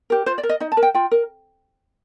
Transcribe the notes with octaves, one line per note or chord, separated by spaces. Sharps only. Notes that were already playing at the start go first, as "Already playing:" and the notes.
G4 A#4
F4 C5
D5
A#4
D#5
D#4 D#5
A5
A#4
G5
F4 G5
A#4